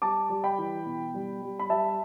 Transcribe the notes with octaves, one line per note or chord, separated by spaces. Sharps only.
G3 A5 D6
G3
G5 B5
E3
B2
G3
G3
B5
G3 E5 A5